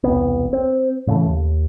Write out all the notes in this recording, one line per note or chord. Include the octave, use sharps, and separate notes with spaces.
E1 C2 C3 B3
C4
A2 C#3 E3 A3
D#2